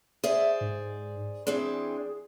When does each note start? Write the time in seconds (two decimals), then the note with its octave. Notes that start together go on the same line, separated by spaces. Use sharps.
0.24 G#4 C5 D5 E5
0.61 G#2
1.47 E3 C4 D4 G#4